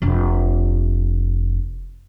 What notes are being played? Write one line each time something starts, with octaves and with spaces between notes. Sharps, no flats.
F1 D4